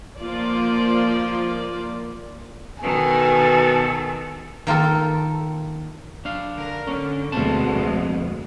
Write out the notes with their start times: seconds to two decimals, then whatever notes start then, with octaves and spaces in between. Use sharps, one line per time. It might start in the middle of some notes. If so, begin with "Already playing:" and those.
0.20 F3 A#3 F4 D5
2.83 B2 D#3 A4 G#5
4.67 D#3 A#3 F4 A4
6.25 D4 F5
6.55 D3 A#4
6.87 D3 C#4
7.32 D2 B2 G#3 C4 A5
7.75 F2